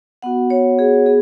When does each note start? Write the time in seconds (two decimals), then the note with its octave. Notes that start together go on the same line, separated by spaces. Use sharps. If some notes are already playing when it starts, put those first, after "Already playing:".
0.22 B3 F#4 F#5
0.50 C#5
0.79 G#4
1.06 B3 G#4